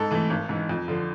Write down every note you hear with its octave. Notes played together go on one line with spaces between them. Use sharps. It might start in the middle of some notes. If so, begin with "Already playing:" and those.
Already playing: G#2 A4
E3 A3
G#1
G#2 E3
F2
D3 F3